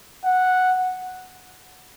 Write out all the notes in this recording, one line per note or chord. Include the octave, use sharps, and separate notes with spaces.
F#5